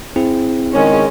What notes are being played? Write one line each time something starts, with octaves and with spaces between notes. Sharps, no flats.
C4 E4 G#4
D#3 G#3 C#4